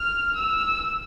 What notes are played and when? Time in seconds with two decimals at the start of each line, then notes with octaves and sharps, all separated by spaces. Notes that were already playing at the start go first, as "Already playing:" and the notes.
Already playing: F6
0.36 E6